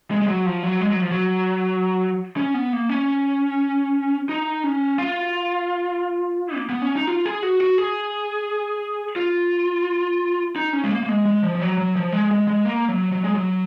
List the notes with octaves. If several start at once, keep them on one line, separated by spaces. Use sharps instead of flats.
G#3
G#3
F#3
F3
F#3
G#3
F#3
F3
F#3
C#4
B3
A#3
C#4
D#4
C#4
F4
A#3
B3
C#4
D#4
F4
G#4
F#4
F#4
G#4
F4
D#4
C#4
G#3
A#3
A#3
G#3
G#3
F3
F3
F#3
F#3
F3
G#3
G#3
G#3
A#3
F#3
F#3
G#3
F#3